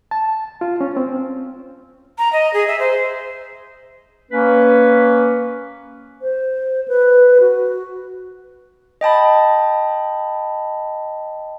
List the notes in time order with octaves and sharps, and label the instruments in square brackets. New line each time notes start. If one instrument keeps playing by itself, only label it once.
[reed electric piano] A5
F4
C#4
C4
[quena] A#5
D#5
G#4
E5
C5
[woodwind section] A#3 C#4 B4
[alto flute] C5
B4
F#4
[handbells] D#5 G5 A5 B5